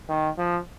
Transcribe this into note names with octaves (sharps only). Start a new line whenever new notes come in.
D#3
F3